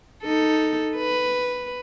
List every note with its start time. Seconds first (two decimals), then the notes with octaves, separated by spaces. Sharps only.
0.24 D#4 A4
0.96 B4